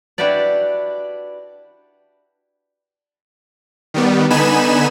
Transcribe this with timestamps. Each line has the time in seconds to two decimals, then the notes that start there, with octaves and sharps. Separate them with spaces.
0.18 D4 E4 F#4 G4 B4 D5
3.94 D#3 G3 B3
4.30 D3 B3 D#4 G#5 B5 E7